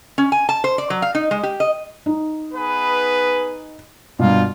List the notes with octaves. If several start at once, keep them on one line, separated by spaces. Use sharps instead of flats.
C#4
G#5
A5
C5
D5
F#3
F5
D#4
G#3
G4
D#5
D#4
B3 G#4 B4
G2 B2 G3 A#3 F4